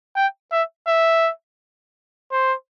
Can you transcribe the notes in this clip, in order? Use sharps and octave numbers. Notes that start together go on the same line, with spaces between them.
G5
E5
E5
C5